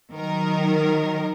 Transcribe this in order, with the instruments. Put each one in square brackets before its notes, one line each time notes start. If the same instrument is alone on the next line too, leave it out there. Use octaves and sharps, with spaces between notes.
[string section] D#3 F#3 A#4